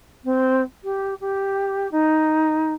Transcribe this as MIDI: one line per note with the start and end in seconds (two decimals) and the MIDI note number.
0.24 0.61 60
0.84 1.14 67
1.21 1.90 67
1.91 2.74 63